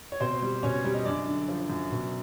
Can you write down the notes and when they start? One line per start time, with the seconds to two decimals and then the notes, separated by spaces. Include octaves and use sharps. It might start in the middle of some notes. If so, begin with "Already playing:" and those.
0.12 C#5
0.20 B2 C4 C5
0.42 G3
0.63 B2 C#4 C#5
0.84 G3
0.94 D#5
1.05 F#2 D4 D5
1.27 D3
1.48 F3
1.70 F#2
1.92 B2